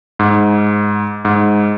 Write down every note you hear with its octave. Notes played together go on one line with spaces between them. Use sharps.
G#2
G#2